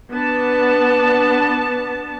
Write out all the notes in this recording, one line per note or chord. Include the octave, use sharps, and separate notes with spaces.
B3 D4 A5